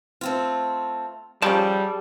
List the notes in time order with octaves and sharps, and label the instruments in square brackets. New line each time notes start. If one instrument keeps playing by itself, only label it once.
[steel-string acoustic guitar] A3 C4 F4
[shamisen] F3 C#4 [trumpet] G3 [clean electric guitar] G#4 G5 A5 [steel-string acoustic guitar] A4